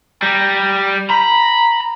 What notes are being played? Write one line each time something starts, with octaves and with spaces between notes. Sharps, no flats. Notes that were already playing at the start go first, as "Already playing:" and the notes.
G3 A#5
A#5 B5